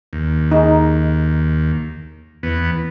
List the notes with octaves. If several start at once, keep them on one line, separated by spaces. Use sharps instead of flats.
D#2
D#4 G#4
E2 B3